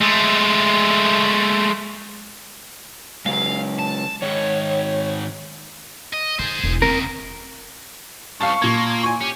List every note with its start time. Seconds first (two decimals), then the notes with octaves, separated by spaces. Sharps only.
0.01 G#3 A3
3.26 C#3 F#3 G#3 F5
3.79 A5
4.22 G#2 D#3 C#5
6.13 D#5
6.39 D#3 G#4 C5
6.64 E1 D#3
6.82 D#2 C#3 C4 A#4
8.41 C2 F5 A5 C#6
8.62 A#2 A#3 G#6
9.03 G#5 C#6
9.21 C#4 G4